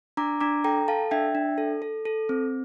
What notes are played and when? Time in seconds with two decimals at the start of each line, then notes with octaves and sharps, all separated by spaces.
0.17 D4 A#5 D6
0.41 D4 A#5 D6
0.64 A4 G5 A#5
0.88 A4 F5 A5
1.11 D4 E5 G5
1.35 D4
1.58 A4
1.82 A4
2.05 A4
2.29 C4